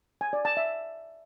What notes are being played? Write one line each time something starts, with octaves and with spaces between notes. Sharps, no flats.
G#5
D5
A5
E5